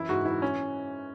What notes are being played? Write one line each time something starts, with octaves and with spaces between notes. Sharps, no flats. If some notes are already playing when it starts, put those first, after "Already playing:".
Already playing: F#2 E3 E4
G#2 F#4
E3 E4
C#4